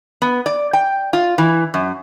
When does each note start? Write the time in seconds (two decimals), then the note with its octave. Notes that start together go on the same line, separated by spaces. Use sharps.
0.22 B3
0.46 D5
0.73 G5
1.13 F4
1.38 E3
1.74 F#2